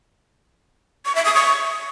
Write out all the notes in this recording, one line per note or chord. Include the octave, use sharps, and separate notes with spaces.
C#6
E5
D#6
C#6